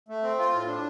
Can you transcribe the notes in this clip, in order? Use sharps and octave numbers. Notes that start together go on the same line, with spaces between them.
A3
C4
F4
A2
D4